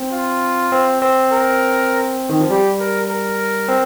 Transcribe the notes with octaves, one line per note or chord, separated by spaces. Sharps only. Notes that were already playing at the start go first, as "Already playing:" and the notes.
Already playing: C4
F4
C4
C4
A#4
D#3
F3
G3 G4
A#4
A#4
C4